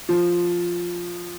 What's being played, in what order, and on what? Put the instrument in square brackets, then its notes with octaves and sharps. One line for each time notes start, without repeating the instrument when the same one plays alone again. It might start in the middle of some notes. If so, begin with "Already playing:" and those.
[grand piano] F3